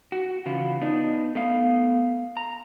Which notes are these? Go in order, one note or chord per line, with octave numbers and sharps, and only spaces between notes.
F#4
C#3 E3 F4 F#4
B3 D4 D#4
A3 B3 F5
A#5